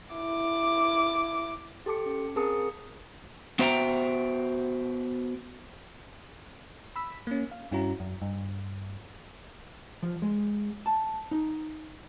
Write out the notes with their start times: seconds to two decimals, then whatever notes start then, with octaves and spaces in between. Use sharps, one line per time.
0.15 E4 D6
1.86 G4 A4 A5 D6 C#7
2.06 C#4
2.36 C4 G#4 A#4 A5 D#6 C#7
3.59 B3 F#4 C5 E5 G5 A#5
6.96 B5 E6 B6
7.27 A#3 C#4
7.51 F5
7.71 G2 C#4 E4 F#4 A#5
8.00 F#2
8.22 G2
10.03 F3
10.22 G#3
10.86 A5
11.31 D#4